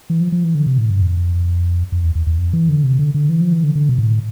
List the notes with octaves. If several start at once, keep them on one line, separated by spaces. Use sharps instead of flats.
E3
F3
F3
E3
D3
C3
A2
G2
F2
F2
E2
E2
E2
F2
E3
D3
C3
D3
D3
E3
F3
E3
D3
D3
B2
A2